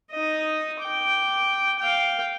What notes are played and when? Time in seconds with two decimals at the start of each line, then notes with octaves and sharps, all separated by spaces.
0.11 D#4 D#5
0.80 G5 D6
1.79 F5 G5